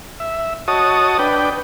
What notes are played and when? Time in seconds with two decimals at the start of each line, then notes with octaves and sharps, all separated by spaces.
0.20 E5
0.68 F#4 C#5 D#5 A5 D#6
1.19 D4 B4 G5